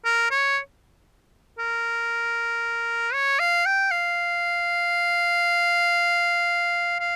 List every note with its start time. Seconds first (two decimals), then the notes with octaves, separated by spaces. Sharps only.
0.05 A#4
0.31 C#5
1.59 A#4
3.13 C#5
3.39 F5
3.66 G5
3.91 F5
7.00 F5